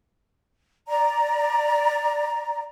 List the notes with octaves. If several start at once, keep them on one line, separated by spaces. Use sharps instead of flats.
D5 A#5